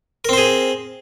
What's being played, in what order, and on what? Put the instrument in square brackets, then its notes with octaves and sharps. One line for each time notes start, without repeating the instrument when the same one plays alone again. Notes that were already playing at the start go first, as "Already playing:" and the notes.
[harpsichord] A#4
C4
C5
G#4